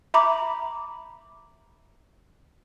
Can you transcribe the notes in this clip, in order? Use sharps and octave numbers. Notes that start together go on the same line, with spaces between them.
E5 A#5 B5 D6